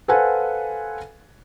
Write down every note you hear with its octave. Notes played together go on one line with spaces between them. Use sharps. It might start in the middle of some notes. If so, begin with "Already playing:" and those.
A4 B4 C5 F5 F#5 G#5